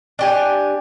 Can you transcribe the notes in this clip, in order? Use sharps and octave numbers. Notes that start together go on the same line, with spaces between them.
D4 G4 G#5